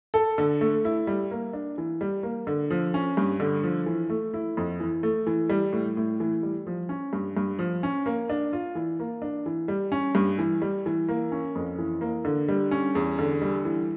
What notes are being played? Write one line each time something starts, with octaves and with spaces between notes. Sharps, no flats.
A4
D3
A3
E4
G3
A#3
D4
E3
G3
A#3
D3
F3
C#4
G2
D3
F3
E3
A3
E4
F2
E3
A3
E3
G3
A2
A2
E3
G3
F3
C#4
G2
G2
F3
C#4
A#3
D4
F4
E3
A#3
D4
E3
G3
C#4
G2
E3
G3
E3
A#3
C#4
F2
E3
A#3
D3
G3
C#4
E2
D3
G3
E3